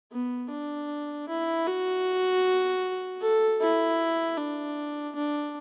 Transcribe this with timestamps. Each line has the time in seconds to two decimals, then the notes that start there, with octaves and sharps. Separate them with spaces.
0.12 B3
0.50 D4
1.29 E4
1.67 F#4
3.22 A4
3.61 E4
4.38 D4
5.16 D4